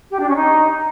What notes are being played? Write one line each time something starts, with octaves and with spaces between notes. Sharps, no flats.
G4
D4
C#4
D#4